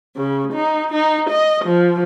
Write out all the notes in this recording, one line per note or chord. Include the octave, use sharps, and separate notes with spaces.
C#3
D#4
D#4
D#5
F3